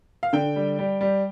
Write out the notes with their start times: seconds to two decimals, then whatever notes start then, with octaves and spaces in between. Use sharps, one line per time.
0.23 F5
0.33 D3 G5
0.56 G3
0.79 G3
1.01 G3